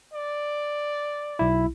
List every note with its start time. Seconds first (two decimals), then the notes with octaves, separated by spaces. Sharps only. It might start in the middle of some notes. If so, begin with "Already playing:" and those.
0.13 D5
1.39 B1 E4